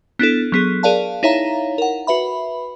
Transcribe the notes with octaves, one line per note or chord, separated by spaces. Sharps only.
B3 D4 E4 A4
F#3 B3 G#4
G#4 A#4 D5 F5 A5
D#4 E4 C#5 E5 F5 A#5
A#4 F#5
F#4 B4 E5 B5